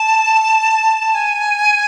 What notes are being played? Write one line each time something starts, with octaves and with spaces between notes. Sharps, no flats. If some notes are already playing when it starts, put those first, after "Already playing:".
Already playing: A5
G#5